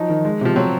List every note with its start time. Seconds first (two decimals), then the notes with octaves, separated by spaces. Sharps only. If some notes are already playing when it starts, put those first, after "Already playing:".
Already playing: F3 F#3 D#4
0.09 D#3
0.25 G#3
0.41 C3 F3
0.56 F#3 C4